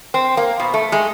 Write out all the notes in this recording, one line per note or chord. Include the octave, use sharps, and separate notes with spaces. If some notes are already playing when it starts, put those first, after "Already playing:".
C4
A#3
B2
A3
G#3